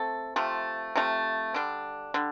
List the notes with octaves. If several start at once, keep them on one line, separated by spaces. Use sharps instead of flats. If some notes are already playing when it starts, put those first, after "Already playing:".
Already playing: A3 C4 A4
C3 F3 A3
C3 F3 A3
D3 G3 D4
D3 G3